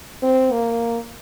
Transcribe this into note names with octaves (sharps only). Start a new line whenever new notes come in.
C4
A#3